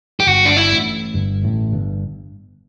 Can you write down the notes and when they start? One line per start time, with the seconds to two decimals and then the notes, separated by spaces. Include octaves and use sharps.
0.20 G4
0.27 G1 G2 F#4
0.45 D4
0.57 E4
0.71 A1 A2
1.14 G1 G2
1.43 A1 A2
1.72 G1 G2